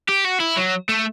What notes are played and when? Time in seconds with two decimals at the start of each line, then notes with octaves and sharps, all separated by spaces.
0.09 G4
0.25 F#4
0.40 E4
0.57 F#3
0.89 A3